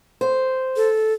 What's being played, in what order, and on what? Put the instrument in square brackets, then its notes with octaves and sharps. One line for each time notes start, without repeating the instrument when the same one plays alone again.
[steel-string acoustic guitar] C5
[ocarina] A4